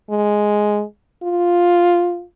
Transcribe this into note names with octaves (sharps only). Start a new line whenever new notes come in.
G#3
F4